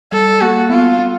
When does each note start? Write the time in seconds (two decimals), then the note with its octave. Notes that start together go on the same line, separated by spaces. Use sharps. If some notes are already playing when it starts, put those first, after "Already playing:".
0.12 G3 A4
0.41 A#3 F#4
0.70 B3 F4
0.99 B3